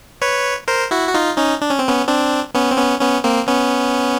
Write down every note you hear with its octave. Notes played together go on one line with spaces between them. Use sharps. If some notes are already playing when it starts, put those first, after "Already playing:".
B4 C#5
A#4 C5
E4 F#4
F#4
D#4 F4
C#4 D#4
D4
C#4
C4
B3 C#4
C4 D4
B3 C#4
C4
B3 C#4
B3 C#4
A#3 C4
B3 C#4